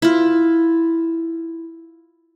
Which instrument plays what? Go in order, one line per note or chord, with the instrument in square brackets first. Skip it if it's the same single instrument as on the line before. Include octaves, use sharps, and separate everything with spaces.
[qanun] E4 F4